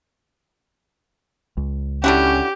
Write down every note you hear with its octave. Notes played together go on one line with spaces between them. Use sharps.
C#2
D3 C#4 E4 F#4 G4